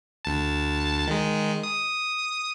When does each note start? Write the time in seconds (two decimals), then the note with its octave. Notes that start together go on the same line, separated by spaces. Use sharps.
0.25 D2 A5
1.07 D#3 G#3
1.63 D#6